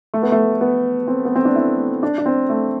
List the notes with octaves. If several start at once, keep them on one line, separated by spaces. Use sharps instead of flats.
A3
B3
A3
B3
C4
B3
C4
D4
E4
D4
D4
C4
A3